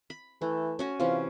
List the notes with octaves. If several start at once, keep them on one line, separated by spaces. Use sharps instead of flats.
B5
E3 A3
C#4 F#4 G#5
C3 E3 C#4 F4